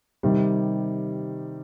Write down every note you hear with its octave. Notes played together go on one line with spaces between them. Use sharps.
C3 D#3 G3